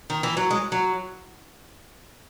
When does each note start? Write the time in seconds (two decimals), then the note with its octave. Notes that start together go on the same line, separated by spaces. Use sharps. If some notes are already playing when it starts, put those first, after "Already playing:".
0.10 D#3
0.23 E3
0.37 F#3
0.51 G#3
0.72 F#3